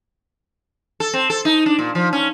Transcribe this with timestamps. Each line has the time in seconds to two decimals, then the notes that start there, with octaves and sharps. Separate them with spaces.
1.00 A4
1.14 C4
1.30 A4
1.45 D#4
1.66 D4
1.79 A#2
1.95 F3
2.13 C#4